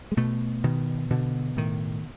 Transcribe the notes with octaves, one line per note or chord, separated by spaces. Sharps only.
G#3
B2 A3
B2 D#3
B2 D3
A2 D#3